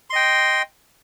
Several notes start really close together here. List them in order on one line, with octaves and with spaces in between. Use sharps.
C6 D#5 G5